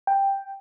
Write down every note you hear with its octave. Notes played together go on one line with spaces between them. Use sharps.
G5